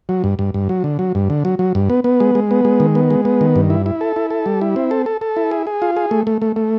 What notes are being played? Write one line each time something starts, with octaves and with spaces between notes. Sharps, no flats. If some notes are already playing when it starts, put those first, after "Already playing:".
F#3
G2
G2
G2
F#3
D3
F#3
G2
D3
F#3
F#3
G2
B3
B3
G#3
G#3
B3
G#3
D#3
B3
G#3
B3
D#3
G2
E4
E4
A4
E4
A4
G3
E4
C4
A4
A4
A4
E4
G#4
G#4
F4
G#4
A3
A3
A3
A3